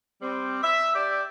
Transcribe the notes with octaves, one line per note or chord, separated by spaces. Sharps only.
G3 C4
E5
G4 D5